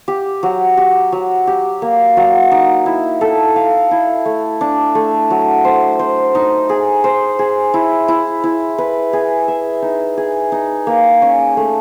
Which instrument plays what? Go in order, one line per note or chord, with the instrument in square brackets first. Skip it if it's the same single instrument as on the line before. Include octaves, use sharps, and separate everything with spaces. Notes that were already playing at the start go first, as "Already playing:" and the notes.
[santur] G4
F#3
G4
F#3
G4
A#3
F#3
D#4
E4
A4
F5
E4
A3
D4
A3
F#3
C5
C5
D#4
G#4
C5
G#4
E4
E4
E4
B4
G#4
E5
D#4
G#4
D#4
A#3
C#4
A3